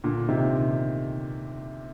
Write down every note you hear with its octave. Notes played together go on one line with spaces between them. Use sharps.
A#2 D3
C3 D#3